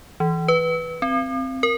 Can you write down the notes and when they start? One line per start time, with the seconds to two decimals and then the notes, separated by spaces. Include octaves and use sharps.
0.20 E3
0.48 B4
1.02 C4
1.63 A#4